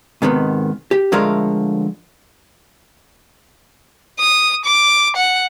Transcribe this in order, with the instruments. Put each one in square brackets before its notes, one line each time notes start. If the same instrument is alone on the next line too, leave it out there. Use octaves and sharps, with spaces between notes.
[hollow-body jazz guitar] G#2 C3 D#3 B3
G4
D3 F3 G#3 A3 A#4 F5
[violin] D#6
D6
F#5